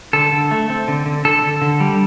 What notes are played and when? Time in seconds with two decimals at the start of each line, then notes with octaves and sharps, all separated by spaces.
0.13 D3 A4
0.32 D3
0.51 A3
0.70 C4
0.88 D3
1.06 D3
1.25 D3 A4
1.42 D3
1.62 D3
1.80 G3